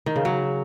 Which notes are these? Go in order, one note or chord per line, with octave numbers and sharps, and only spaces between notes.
D#3
C#3
F#3